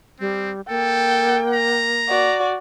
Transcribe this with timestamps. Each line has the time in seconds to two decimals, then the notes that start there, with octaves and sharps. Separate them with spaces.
0.20 G3 C4
0.69 A#3 A4 G5
1.54 A#5
2.09 F#4 D5